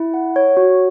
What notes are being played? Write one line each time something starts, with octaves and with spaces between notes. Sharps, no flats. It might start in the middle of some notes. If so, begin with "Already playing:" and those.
Already playing: E4
F#5
C#5
F#4